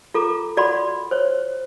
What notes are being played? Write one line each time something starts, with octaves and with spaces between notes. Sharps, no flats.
F4 A4 A#5 D6
F4 F#4 D5 F#5 B5 C6
C5 C#5